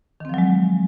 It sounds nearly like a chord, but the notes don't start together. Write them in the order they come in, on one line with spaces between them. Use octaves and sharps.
D#3 C4 F3 F#3 G#3